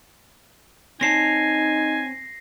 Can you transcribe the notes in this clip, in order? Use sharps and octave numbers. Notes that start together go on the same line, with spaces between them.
C4 D#4 C#5 G#5 A5 A#6 C7